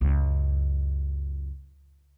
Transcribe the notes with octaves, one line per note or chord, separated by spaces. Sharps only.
C#2 F#2